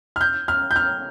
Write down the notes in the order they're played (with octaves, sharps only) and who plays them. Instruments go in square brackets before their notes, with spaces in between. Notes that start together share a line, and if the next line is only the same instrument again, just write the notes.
[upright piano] F6
G6
F6
G6
F6